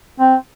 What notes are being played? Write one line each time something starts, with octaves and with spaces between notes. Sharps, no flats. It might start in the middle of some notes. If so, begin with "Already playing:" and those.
C4